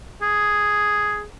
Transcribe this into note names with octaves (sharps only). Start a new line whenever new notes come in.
G#4